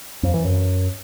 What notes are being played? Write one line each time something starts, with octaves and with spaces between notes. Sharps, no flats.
F2
E3
F#2